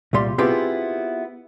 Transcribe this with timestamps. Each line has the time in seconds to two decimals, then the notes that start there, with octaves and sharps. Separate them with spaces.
0.13 C2 A#2 G3 C6
0.38 B3 C4 E4 F4 G4 G#4